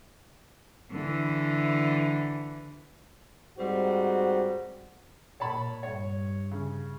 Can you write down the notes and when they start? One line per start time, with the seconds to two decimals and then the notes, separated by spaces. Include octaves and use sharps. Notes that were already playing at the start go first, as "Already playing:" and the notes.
0.91 D3 E3
3.57 G#2 G3 C4 F#4
5.40 A#2 C#5 A5 B5
5.83 G2 C#5
6.51 C#3